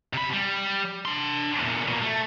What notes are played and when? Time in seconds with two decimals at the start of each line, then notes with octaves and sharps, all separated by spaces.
0.13 C3 B5
0.33 G3
1.05 D4 C6
1.60 E2 A#2
1.88 B2 A#3
2.02 A3